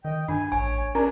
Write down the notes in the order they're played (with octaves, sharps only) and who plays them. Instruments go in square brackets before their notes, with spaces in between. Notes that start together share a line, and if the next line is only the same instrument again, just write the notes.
[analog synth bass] D#3 [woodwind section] D#5 G5
[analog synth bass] G2 [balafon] D4 [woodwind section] G#5
[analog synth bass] A1 [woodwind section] C#5 [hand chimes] G#5
[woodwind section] E2 D4 [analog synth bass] C#4 [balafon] A#4 A#5